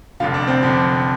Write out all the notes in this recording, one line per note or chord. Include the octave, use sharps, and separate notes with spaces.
F1 F2 D3 F4
D4
C4
F1 F2 D3